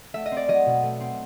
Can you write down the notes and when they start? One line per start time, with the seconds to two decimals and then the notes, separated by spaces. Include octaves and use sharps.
0.14 A3 E5
0.26 D#5
0.31 C4
0.37 D5
0.48 F#3 D#5
0.66 B2
0.83 A3
1.00 C4